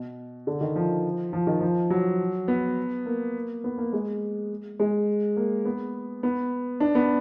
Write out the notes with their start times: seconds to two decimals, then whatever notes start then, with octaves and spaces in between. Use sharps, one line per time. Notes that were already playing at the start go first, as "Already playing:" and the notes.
Already playing: B2
0.47 D3
0.61 D#3
0.76 F3
1.33 F3
1.47 D#3
1.60 F3
1.90 F#3
2.48 B3
3.06 A#3
3.64 B3
3.78 A#3
3.93 G#3
4.80 G#3
5.37 A#3
5.65 B3
6.23 B3
6.80 D4
6.95 B3